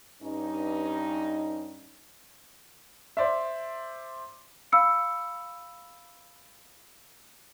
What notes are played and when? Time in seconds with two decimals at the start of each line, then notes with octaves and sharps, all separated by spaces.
0.22 G2 C#4 D#4
3.17 C5 D5 E5
4.72 F5 B5 E6 C#7